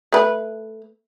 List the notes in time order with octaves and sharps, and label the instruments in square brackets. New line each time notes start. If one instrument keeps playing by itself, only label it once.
[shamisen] A3 B4